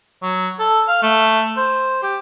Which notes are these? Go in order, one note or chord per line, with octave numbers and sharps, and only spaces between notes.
F#3
A4
F5
A3
C5
G4